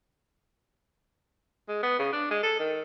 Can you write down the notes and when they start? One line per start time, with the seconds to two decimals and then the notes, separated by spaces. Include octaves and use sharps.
1.68 G#3
1.83 B3
1.99 C#3
2.12 D4
2.31 G#3
2.43 A4
2.59 D#3